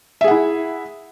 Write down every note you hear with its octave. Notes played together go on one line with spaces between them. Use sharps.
E4 G#4 E5 F#5